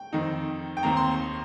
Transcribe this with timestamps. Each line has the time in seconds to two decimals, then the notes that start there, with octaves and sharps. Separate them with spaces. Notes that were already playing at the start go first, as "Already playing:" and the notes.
Already playing: G5
0.13 F2 D#3 C4 D#4
0.77 G5
0.83 D#2 D#3 C4 A#5
0.97 C6